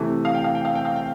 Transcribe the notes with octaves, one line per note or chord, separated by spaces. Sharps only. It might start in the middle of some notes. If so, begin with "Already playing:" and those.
Already playing: C3 E3 A3
F5
G5
F5
G5
F5
G5
F5
G5